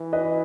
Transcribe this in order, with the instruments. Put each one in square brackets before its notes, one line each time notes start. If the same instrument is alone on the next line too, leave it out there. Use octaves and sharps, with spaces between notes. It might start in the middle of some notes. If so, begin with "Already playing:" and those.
Already playing: [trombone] E3
[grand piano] B4 D#5